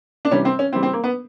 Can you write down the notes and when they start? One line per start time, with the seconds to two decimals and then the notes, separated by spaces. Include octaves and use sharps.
0.25 D4
0.31 C3 E3 G3 C#4
0.45 C4
0.59 C#4
0.73 C#3 E3 G3 C4
0.83 C4
0.93 A#3
1.04 B3